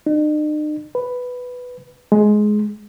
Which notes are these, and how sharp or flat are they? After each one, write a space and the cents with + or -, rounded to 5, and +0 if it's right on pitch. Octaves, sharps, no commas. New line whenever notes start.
D#4 -45
B4 +5
G#3 +15